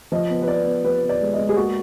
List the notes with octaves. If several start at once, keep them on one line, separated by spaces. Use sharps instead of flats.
F3 D#5
B3
B4
B3 D5
B3
F3 B4
B3
D5
G#3
D#5
G#3
G#4
A#3 F#4